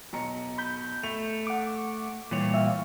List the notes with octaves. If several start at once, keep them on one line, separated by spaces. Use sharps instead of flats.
B1 A#5 C#7
B5 G6
A3 F7
F#5 D6
A#2 E3 G3 C#5
E5 F5